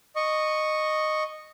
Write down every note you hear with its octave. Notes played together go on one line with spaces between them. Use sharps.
D#5 C#6